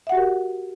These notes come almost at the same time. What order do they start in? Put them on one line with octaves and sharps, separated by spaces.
E5 F#5 F#4 G4 A#4